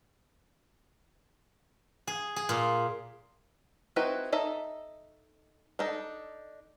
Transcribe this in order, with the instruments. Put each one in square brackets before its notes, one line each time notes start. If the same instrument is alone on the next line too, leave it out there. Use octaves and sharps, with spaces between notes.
[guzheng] G#4
G#4
A#2
[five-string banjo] C4 D#4 E4 F#4 B4
D#4 A4 E5
D4 D#4 A4